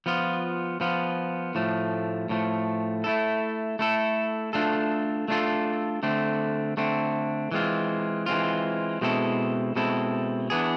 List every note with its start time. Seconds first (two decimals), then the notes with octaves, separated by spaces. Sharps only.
0.06 F3 B3 F4
0.81 F3 B3 F4
1.55 A2 F3 A3
2.29 A2 F3 A3
3.04 A3 E4 A4
3.79 A3 E4 A4
4.53 A3 D4 F4 A4
5.28 A3 D4 F4 A4
6.03 D3 A3 C4
6.77 D3 A3 C4
7.51 E3 G#3 C4 F4
8.26 E3 G#3 C4 F4
9.01 B2 G#3 C4 E4 A4
9.76 B2 G#3 C4 E4 A4
10.50 E3 B3 D4 G#4